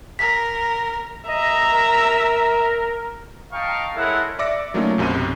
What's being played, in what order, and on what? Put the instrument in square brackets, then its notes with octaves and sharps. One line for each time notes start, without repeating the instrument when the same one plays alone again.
[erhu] A#4 [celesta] B6
[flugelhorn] D#5 [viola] E5 A#5
[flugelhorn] A#4
[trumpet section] D#5 F5 G5 A5 A#5 C#6
G#3 E4 A4 A#4 C#5 F#5
[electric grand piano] D5 E5 D6 E6 A#6 C#7
F#3 A3 A#3 C#4 D#4 F4
B1 F#2 C3 F#4 D#7